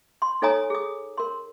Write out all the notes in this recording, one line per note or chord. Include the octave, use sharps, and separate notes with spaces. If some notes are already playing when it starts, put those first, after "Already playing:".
C6
D#4 A4 C#5 G#5 A#5 D#6
G#4 D#6
A#4 C6